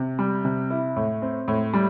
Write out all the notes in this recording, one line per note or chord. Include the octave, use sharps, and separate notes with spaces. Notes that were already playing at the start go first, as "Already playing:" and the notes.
Already playing: C3
G3
C3
E4
A2
C4
A2
G3